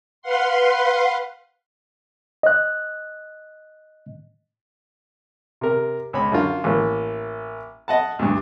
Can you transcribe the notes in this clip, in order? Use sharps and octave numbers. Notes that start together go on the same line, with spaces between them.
B4 F5 F#5 C6
D#5 F#6
C3 A#4
C#2 C#5 B5
F#2 D3 F4
A1 A#3
D#5 F#5 A5
D2 G2